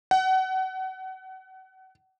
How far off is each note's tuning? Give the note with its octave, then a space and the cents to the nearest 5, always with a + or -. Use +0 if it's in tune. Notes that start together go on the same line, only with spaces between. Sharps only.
F#5 +30